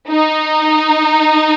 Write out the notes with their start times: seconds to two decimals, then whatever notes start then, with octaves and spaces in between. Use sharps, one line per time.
0.10 D#4